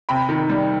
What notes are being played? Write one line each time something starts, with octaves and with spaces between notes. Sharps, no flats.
C3 G5 B5
D#3
G3